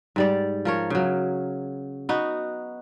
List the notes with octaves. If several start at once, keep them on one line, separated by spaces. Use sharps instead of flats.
G#2 G3 D5
F3 A#4 C#5
C#3 F#3
B3 D#4 F#4